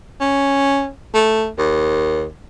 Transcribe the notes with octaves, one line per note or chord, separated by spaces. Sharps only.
C#4
A3
D#2